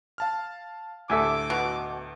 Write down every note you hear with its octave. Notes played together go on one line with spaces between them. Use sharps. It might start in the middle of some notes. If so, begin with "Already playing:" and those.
F5 A5 F6
D2 A2 A4 E5 G#5 D6
B2